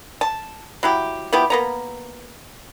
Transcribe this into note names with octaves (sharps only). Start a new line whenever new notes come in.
A5
F#3 E4 G4
F3 B3 E4 G4
A#3 B3 A#5